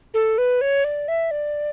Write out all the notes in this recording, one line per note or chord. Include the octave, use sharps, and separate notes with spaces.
A4
B4
C#5
D5
E5
D5